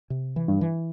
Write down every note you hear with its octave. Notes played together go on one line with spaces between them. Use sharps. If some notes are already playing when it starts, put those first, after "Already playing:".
C3
E3
G2
E3